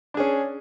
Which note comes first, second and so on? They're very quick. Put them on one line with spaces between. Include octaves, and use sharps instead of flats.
D4 G#4 C#4